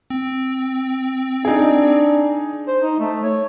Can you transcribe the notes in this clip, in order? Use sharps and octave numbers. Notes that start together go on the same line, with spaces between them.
C4
D4 D#4 G#4
C5
D#4
A3
C#5